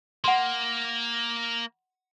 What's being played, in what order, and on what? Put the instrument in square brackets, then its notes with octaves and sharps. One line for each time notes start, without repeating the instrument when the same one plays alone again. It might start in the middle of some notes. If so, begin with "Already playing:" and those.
[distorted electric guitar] A#3 [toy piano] F#5 C6